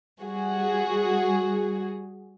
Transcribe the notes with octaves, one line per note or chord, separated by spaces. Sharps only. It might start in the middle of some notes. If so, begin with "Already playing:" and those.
G3 F#4 G#4